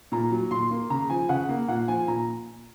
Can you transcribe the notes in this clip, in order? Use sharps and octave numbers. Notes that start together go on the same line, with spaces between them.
A#2 A#5
F#3
A#2 C6
A#3
C#3 A#5
F3 G#5
C#3 F#5
A#3
A#2 F#5
F3 G#5
A#2 A#5